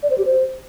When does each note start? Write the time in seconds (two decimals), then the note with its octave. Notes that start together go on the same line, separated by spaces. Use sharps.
0.03 D5
0.10 C5
0.18 G4
0.25 C5